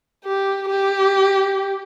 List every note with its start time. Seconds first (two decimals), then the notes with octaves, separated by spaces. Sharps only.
0.24 G4
0.70 G4